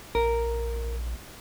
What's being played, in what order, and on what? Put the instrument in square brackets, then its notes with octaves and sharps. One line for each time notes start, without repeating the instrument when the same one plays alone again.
[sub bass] A#1 [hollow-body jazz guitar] A#4